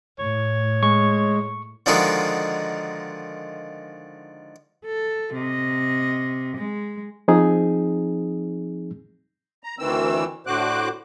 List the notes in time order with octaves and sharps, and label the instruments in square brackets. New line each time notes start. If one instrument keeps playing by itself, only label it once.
[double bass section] A2 [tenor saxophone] C#5
[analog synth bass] G#3 [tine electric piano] C#6
[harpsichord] D3 D#3 F3 G#3 D#4 F#4
[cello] A4
C3 D#5
G#3
[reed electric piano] F3 C4 D#4 G#4
[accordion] A#5
D2 D#3 E3 C4 E6
A2 D3 F#4 C5 D6 F#6